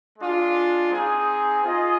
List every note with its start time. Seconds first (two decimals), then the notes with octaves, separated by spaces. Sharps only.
0.18 G#3 D4 F4
0.91 C4 D#4 G#4
1.64 F4 G#4 D#5